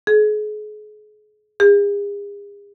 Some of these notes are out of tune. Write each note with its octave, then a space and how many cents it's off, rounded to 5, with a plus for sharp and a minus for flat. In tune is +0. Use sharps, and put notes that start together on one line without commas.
G#4 +35
G#4 -40